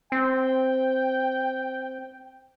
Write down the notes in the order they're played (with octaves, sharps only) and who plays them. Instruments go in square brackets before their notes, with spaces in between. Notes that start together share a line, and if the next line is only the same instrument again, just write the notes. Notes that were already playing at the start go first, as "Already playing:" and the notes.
[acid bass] C4 [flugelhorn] G5